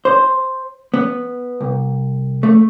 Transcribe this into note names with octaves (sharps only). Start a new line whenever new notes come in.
C5
B3
C2
A3